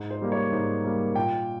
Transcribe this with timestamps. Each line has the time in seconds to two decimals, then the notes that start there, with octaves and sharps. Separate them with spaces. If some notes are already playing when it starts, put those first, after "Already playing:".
Already playing: G#2
0.11 C5
0.21 G3 A#3
0.32 C#5
0.52 G#2 C5
0.84 G3 A#3
1.15 A#2 G5